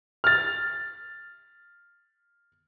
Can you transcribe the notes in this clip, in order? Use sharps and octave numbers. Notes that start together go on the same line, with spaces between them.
F6 A6